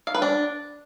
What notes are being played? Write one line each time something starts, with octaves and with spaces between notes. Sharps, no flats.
F5
B4
D4